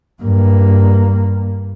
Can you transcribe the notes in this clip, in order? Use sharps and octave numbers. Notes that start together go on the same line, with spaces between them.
G2 A#3